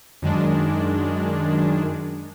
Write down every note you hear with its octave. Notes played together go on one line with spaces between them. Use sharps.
F#2 D#3 G#3 D4